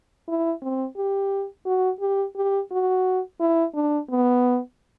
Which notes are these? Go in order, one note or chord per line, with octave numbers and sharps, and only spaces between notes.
E4
C4
G4
F#4
G4
G4
F#4
E4
D4
B3